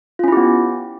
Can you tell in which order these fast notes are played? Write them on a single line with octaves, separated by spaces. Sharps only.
F4 C#4 E4 G4 B3